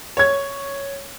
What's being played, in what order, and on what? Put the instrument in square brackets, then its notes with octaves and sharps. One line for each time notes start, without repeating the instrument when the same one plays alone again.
[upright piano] C#5 G#6